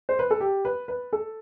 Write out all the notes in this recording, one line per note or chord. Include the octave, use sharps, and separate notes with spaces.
C5
B4
A4
G4
B4
B4
A4